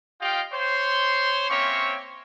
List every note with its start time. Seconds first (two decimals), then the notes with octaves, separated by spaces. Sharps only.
0.21 F4 G4 D#5 F5 G5
0.53 C5 C#5 C6
1.49 A#3 C4 C#4 C#5 E5 C#6